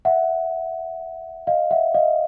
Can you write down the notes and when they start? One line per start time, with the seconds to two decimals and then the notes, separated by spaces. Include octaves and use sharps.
0.05 E5 F#5
1.47 D#5 F5
1.71 E5 F#5
1.94 D#5 F5